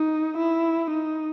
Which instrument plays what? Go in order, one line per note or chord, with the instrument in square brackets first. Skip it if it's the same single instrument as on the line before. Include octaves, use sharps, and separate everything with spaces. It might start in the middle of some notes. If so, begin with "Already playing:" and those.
Already playing: [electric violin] D#4
E4
D#4